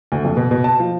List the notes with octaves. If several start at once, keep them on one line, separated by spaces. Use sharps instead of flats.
D2
F2
B2
B2
A5
F3